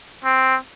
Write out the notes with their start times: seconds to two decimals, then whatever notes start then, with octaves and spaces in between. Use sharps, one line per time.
0.25 C4